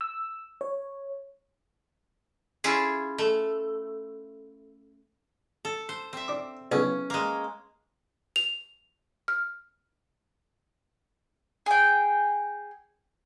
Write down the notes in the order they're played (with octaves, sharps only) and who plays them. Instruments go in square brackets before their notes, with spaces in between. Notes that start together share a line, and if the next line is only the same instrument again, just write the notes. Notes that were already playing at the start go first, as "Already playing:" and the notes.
[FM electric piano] E6
C#5
[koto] C#4 E4 F4 G#4
A3
A4
C5
C4 E5
[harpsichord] D4 D6
[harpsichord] B1 A2 C#3 [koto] C#4 [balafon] B4
[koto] G#3 A#3
[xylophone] F7
F6
[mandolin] G#4 G5